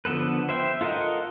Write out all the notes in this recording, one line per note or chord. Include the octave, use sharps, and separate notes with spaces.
D3 F3 B3 A4 B4
C5 E5 G5
F4 A4 A#4 D#5 F#5